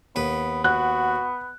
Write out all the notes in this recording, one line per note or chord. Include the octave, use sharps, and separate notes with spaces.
D#2 B3 B4
B3 F#4 F#6